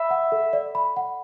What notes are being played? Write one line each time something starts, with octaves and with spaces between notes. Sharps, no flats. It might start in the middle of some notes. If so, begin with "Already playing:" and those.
Already playing: E5 B5
F#5
A4
D5
B5
F#5